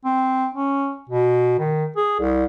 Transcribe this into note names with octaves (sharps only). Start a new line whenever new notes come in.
C4
C#4
B2
D#3
G#4
C2